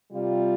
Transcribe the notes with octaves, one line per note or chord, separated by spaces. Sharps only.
C3 G3 F4